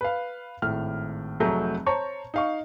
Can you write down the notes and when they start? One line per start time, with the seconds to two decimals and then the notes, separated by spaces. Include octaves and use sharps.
0.01 B4 F5
0.62 G#1 A2 F6
1.40 F1 F#3 A3 G#4 A#5 G6
1.86 C5 C#5 A5 A#5 C#6
2.34 D#4 F5 C#6